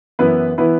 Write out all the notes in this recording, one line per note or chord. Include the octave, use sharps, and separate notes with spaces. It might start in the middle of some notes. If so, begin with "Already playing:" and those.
F#2 E3 B3 E4 B4
E3 B3 E4 B4